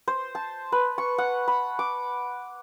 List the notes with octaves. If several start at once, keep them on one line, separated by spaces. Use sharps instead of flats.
C5
A5
B4
C#6
F#5
B5
D6